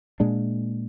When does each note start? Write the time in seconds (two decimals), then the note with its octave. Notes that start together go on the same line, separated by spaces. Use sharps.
0.20 A#2 G#3 D4